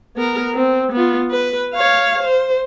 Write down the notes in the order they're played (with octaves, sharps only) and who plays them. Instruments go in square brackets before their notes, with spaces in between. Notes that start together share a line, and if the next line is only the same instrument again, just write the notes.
[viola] B3 A#4
C4
B3 F4
B4
C#5 F5
C5